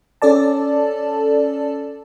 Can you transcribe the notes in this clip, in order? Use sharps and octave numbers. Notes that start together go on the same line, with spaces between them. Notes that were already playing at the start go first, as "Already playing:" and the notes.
C#4 A4 D5 A5